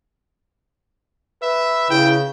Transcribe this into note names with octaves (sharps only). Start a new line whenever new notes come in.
B4 E5
C#3 E4 G5